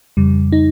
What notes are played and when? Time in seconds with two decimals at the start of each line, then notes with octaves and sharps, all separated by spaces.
0.17 F2 C#3 G3
0.52 D#4